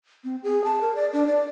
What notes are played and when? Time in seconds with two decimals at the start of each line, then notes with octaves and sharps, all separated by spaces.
0.24 C4
0.43 G#4
0.64 A5
0.81 A#4
0.95 D5
1.13 D4
1.27 D5